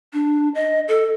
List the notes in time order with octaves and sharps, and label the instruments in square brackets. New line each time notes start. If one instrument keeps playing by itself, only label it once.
[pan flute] D4
D#5
A4